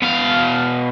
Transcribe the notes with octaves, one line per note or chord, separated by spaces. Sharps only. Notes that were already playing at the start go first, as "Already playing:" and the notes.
B2 F5